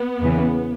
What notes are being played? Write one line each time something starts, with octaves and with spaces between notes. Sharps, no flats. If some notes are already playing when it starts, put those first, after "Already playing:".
Already playing: B3
E2 C#3 E3